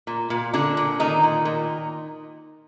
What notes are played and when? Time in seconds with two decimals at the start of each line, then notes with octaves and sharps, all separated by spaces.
0.07 A#2
0.30 A#2
0.53 A#2 D3 D4
0.77 A#2
1.00 A#2 D#3 D#4
1.23 A#2
1.45 A#2